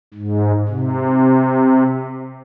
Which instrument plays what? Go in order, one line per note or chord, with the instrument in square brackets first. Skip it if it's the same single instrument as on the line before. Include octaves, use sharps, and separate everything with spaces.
[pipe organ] G#2
C3